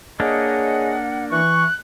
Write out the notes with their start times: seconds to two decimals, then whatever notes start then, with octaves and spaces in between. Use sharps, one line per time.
0.20 A#3 D4 G#4 C#5 D#5 F#5
1.31 E3 C#6 F#6